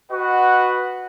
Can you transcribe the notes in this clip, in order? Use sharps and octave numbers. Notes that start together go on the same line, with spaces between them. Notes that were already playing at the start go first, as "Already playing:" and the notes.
F#4 B4 D#5 F#5